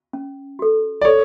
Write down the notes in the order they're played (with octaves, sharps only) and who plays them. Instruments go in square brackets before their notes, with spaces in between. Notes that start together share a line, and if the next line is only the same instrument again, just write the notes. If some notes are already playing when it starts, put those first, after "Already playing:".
[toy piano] C#4
F#4 A4
[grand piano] D5
[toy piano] A4 [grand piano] C#5